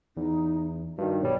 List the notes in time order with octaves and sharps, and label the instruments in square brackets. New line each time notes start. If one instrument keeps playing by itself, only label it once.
[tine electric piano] E2 [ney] D#4
[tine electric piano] G2 D#3 [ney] F#4
[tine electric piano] B1 G3 [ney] C#5